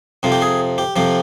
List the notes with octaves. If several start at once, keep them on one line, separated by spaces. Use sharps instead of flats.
F2 C3 F3
G4
G#4
G4
F2 C3 F3 G4